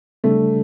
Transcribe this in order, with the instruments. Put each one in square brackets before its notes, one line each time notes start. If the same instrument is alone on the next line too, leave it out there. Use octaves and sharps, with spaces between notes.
[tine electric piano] C#3 G3 D4 [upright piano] A3